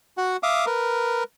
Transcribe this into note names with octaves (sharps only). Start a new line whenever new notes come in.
F#4 F#5
E5 F5 D6 D#6
A#4 B4